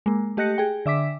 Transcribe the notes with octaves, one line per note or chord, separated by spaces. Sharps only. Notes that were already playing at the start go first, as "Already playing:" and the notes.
G#3 A#3
A3 G4 D#5 F#6 A#6 C#7
G#4 G5
D3 E5 D6 B6